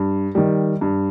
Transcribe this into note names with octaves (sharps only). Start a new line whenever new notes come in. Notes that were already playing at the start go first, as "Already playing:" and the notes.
Already playing: G2
D#3 G3
G2